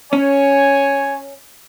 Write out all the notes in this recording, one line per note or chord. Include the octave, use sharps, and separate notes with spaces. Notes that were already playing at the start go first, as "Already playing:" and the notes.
C#4 C#5 G#5